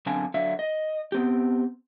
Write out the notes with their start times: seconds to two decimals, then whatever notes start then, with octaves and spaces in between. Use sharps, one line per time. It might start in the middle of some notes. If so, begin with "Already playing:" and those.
0.06 F#2 D3 C4 F5 G#5 A5
0.34 D3 F#3 E5 F5
0.59 D#5
1.12 B3 C4 G4